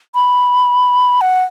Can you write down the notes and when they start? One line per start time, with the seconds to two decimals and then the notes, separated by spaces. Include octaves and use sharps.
0.15 B5
1.21 F#5